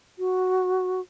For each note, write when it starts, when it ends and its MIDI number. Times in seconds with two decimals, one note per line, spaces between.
0.19 1.00 66